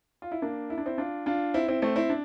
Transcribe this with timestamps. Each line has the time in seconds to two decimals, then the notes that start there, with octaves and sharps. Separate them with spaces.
0.22 F4
0.31 E4
0.42 A#3 D4
0.70 E4
0.78 D4
0.86 C4 E4
0.98 D4 F4
1.26 D4 F4
1.54 C4 E4
1.68 C4 E4
1.82 A3 C4
1.96 C4 E4
2.10 D4